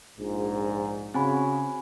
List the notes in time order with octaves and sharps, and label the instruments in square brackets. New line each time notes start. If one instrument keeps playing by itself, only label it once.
[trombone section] A#1 G#2
[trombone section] C#3 F#4 [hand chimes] C4 G#5 B5